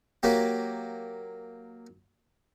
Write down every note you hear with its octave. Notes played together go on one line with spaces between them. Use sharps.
F#3 A#3 G4